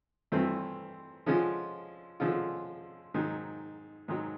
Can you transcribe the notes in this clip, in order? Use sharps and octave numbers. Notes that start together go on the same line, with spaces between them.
G2 E3 A3 C4
D3 F3 G#3 C#4 F4
D3 F3 G#3 C#4 F4
G#2 D#3 F#3
G#2 D#3 F#3